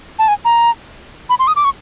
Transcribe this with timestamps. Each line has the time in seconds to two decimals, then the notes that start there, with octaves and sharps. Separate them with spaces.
0.19 A5
0.28 G#5
0.45 A#5
1.30 B5
1.39 C6
1.47 D#6
1.56 D6
1.64 C#6